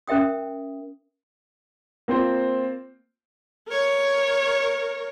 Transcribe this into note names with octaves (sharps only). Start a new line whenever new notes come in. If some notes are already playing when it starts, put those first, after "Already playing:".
C#4 A#4 E5 G5 D#6
A#3 C4 F4 C5
A#4 C#5